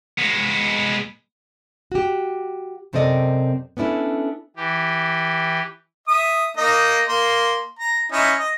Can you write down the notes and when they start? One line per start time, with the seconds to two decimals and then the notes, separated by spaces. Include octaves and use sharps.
0.19 G#3 B3
1.92 F#4 G4
2.93 F#2 C3 C4 A4 D5 D#5
3.77 B3 C#4 D4 E4 A4
4.57 E3 G4
6.08 E5 D#6
6.57 A#3 D#4 D#5
7.09 A#3 C6
7.79 A#5
8.12 C#4 D#4 E4
8.38 D#5